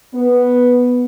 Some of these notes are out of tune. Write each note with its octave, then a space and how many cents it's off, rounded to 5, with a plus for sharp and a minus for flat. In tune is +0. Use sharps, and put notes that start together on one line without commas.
B3 -5